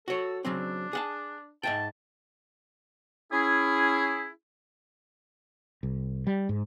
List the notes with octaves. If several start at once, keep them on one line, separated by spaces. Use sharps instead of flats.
F#4 A4 C#5
C#3 F#3 C4 D4
G#4 F#5 A5
G#2 E5 G5 A5
C#4 E4 G#4
C2
G3
G#2